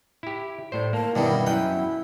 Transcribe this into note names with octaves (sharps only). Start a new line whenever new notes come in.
E4 G4
A2 C5 D5
A#3 A5
G2 B2 D#3 G3 E4
F#2 E4 F#5 G5